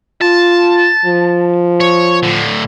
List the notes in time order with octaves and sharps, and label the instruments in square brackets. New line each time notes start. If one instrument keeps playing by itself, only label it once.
[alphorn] F4 [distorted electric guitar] A5
[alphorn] F3
[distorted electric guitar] C#5
A2 D3